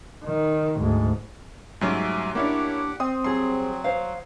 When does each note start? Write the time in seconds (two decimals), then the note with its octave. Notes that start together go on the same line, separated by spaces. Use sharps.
0.24 D#3
0.78 D2 G#2
1.81 G#2 F#3 G3 A3 C#4 E5 G#5 D6
2.35 A#3 C#4 D4 E4 G4 C#5 F#5 D6
3.00 C4 C6 D#6
3.24 F#3 G3 G#4 C6
3.84 C5 F5